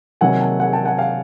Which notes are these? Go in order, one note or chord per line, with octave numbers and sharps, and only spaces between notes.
C3 D#3 F#3 A#3 F#5 G#5
G5 A5
F#5 G#5
G5 A5
F#5 G#5
F5 G5